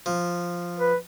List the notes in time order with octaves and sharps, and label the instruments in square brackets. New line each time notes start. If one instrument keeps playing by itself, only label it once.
[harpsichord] F3
[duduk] B4